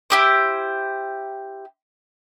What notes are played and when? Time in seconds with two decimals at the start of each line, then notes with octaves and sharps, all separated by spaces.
0.10 E4 G4 C5